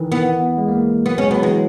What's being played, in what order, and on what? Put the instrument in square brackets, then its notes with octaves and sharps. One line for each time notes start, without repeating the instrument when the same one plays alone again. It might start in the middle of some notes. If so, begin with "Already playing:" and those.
Already playing: [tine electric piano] D#3 E3
[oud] B3
[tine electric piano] G#3
A#3
[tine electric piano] F#3 [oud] B3
[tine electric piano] G#3 [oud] C#4
[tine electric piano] F#3 [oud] B3
[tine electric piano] E3 [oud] G#3